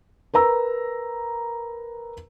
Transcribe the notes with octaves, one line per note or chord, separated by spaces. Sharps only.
A#4 B4 A#5 E6